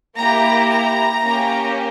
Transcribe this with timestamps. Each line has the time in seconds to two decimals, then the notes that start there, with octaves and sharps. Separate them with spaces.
0.17 A#3 E4 G4 A#5
0.71 A#5
1.24 A#3 C#4 G4